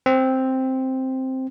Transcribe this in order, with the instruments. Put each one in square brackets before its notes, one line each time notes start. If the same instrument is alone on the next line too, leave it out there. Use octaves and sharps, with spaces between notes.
[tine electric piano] C4